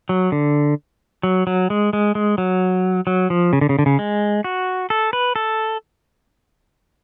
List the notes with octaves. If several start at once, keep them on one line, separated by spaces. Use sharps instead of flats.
F#3
D3
F#3
F#3
G#3
G#3
G#3
F#3
F#3
F3
C#3
D3
C#3
D3
C#3
G#3
F#4
A4
B4
A4